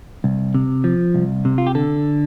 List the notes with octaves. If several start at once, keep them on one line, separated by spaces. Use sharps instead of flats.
C2
C3
F3
C2
C3
F4
G4
D3 A4